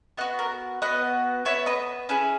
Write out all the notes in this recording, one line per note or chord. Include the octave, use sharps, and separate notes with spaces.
B3 F#4 D#5 F#5
A#4
B3 F#4 B4 D#5
B3 F#4 C#5 E5
B4 D#5
C#4 E4 G#4 B4